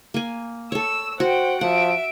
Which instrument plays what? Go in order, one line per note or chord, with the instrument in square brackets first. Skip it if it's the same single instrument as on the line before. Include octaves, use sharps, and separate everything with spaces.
[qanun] A#3 G#5
[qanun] A4 C#5 [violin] E6
[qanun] F#4 [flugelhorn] C5 [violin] F#5 G5
[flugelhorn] F3 [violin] E5 D7 [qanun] F#5